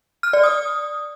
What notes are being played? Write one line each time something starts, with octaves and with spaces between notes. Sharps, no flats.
F6
D5
D#6